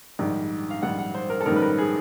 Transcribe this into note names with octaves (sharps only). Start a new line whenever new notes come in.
A#1 G#2 D#3 G3
F5
A#1 G#2 D#3 G3 F#5
F#5
C5
A#4
A4
A#1 G#2 D#3 G3 A#4
B4
A#4
G#4